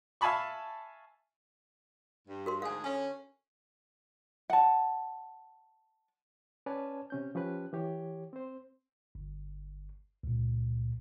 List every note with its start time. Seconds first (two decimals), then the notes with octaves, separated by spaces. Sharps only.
0.21 E5 F5 G#5 A5 B5 C#6
2.28 G2
2.46 F#4 A#4 C6
2.62 D2 G#2 G#4 F5 G#5
2.84 D3 C#4 G#5
4.50 F#5 A5
6.66 C#4 B4 C#5 D5 G#5 A5
7.10 C3 C#4 G6
7.35 F3 C#4 G4 B4 F#6
7.73 E3 G4 C#5
8.33 C4 C5
9.15 G1
10.23 C#2 A#2